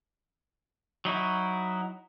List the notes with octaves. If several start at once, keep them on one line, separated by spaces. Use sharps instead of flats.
F#3 D#4 E4 F#4